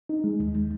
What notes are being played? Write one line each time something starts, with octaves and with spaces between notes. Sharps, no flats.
D#4
G#3
D#2